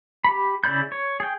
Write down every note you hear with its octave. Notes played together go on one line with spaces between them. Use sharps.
G4 B5
C#3 E4 D5 B5 G6
C#5
G#4 G5